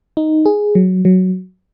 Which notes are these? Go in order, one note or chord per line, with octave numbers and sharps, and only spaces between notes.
D#4
G#4
F#3
F#3